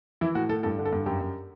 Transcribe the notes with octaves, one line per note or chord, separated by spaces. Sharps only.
E3 E4
A2 F#4
A2 A4
G2 A4
D3
A4
G2
F#2 G4
F#2